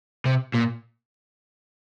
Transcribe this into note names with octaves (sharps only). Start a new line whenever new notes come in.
C3
A#2